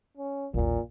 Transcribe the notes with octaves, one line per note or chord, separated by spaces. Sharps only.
C#4
A1 D#2 A#2